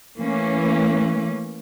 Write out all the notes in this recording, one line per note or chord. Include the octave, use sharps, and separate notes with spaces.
E3 A3 A#3 C#4